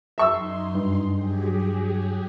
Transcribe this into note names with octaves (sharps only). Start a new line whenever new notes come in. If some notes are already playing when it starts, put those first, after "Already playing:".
F#2 D#4 E5 C6 C#6 E6
G2
F#3 G4 G#4